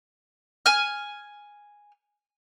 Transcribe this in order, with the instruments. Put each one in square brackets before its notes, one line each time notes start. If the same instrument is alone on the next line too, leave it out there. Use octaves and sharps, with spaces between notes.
[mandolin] G#5 F6